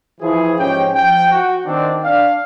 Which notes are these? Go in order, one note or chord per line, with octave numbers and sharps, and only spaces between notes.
E3 F3 E4 G#4
G#2 F3 C#4 G4 G5
F3 G5
F#4
D#3 C4 D4
D4 F5